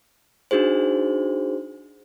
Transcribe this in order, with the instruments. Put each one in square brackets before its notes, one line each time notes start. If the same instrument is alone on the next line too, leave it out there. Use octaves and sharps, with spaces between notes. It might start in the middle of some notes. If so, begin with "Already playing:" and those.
[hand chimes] D4 D#4 F#4 G#4 C5